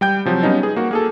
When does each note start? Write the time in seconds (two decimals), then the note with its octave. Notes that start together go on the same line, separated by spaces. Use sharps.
0.01 G3 G5 G6
0.25 C3 F3 F#3
0.43 G3 B3 C#4 D#4
0.63 G#4
0.76 A#3 F#4
0.91 A#3 G#4 A4